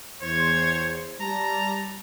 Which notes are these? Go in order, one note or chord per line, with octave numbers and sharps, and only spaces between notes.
E2 C5 C#5
G3 A5 A#5